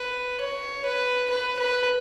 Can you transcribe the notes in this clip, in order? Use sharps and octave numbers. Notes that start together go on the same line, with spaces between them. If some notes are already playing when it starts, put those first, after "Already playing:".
Already playing: B4
C#5
B4
B4
B4